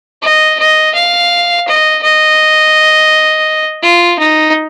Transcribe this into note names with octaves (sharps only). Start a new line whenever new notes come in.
D#5
D#5
F5
D#5
D#5
F4
D#4